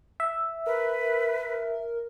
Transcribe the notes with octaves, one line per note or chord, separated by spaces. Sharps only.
E5
A#4 B4